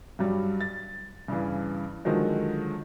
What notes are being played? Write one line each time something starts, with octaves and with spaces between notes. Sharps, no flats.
G2 F#3 G3
A6
G2 C#3 E3
D3 D#3 F3 F#3 G#3